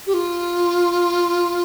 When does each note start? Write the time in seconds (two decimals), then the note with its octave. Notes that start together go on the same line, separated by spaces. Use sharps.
0.06 G4
0.13 F4